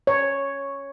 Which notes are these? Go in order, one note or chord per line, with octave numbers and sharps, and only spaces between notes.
C#5